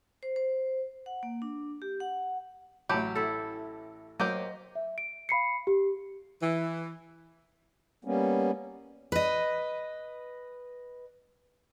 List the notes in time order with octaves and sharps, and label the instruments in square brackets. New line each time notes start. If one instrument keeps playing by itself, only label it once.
[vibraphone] C5
C5
F#5
A#3
D4
G4
F#5
[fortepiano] A1 A5 B5 [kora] F#3 [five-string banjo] G4
[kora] E4 A4
[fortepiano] F#3 [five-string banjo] A#3 G4 C5 [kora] D#5
[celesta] E5
D7
F5 B5 C7 C#7
G4
[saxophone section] E3
[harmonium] G3 A#3 B3 C#4
[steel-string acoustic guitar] B4 D#5